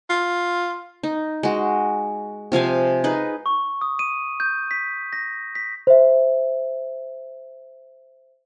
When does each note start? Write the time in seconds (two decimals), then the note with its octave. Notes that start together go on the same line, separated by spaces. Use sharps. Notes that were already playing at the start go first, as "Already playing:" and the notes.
0.10 F4
1.03 D#4
1.43 G#3 F#4
2.52 C3 F3 F5 G#5
3.04 D#4 G#4 B4
3.46 C#6
3.81 D#6
3.99 D#7
4.40 G6
4.71 B6
5.13 A#6
5.55 B6
5.87 C5 E5